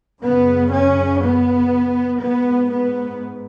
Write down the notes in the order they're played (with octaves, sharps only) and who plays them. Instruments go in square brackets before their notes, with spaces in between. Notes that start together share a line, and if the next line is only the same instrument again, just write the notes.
[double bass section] F#2 C#3 B3
C#4
B3
G#2 B3
B3